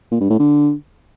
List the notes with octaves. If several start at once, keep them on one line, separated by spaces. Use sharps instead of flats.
A#2
G2
A2
D3